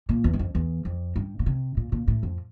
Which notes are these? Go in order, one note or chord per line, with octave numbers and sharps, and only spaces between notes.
A#2
E2
G2
F2
E2
F2
G2
A#2
C3
A#2
A#2
A2
F2